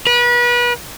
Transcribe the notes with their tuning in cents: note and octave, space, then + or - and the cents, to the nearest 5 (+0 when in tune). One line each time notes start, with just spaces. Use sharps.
B4 -35